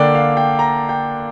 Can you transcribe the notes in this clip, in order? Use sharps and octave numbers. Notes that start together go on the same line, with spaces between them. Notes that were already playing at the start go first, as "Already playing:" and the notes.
Already playing: D3 A#3 D4 D5 G5
F5
G5
A#5
G5